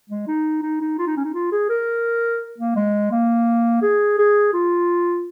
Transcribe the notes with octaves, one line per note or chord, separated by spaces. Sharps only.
G#3
D#4
D#4
D#4
F4
D#4
C#4
D#4
F4
G#4
A#4
A#3
G#3
A#3
G#4
G#4
F4